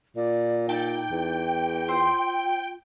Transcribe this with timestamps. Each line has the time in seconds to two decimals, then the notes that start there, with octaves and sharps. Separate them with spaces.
0.16 A#2 D5
0.69 D#4 A4 D5 G5 A5
1.11 E2
1.88 F4 C5 C6 E6